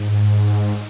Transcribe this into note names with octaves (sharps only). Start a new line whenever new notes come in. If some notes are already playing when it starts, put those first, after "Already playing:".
Already playing: G#2